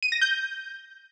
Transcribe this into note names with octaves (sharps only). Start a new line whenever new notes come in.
D#7
A#6
G6